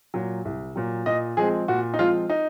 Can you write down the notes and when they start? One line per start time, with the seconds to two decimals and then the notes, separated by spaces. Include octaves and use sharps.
0.14 A#2 F#3
0.45 C2
0.76 A#2 F#3
1.06 A#2 D#5
1.37 F3 G#3 C4 G#4
1.68 A#2 F#4
1.94 D#4
1.99 F3 G#3 C4 F4
2.30 D#4